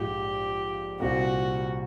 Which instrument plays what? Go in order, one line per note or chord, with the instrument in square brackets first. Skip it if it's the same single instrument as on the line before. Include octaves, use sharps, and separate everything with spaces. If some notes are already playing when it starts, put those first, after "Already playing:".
Already playing: [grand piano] A#1 G#2 F3 [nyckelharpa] G4
[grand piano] C2 A#2 G3 C4 [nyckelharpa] F#4